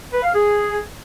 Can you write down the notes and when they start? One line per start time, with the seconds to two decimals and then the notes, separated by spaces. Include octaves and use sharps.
0.13 B4
0.23 F5
0.34 G#4